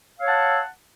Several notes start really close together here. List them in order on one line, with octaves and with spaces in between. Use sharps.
F5 E6 C#5 F#5 A5